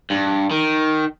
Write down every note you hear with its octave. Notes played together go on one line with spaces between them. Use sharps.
G2
D#3